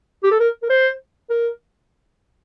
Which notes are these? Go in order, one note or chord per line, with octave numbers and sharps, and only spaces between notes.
G4
A4
A#4
A#4
C5
A#4